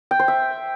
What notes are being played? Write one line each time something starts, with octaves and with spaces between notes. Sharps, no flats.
G5
C5
E5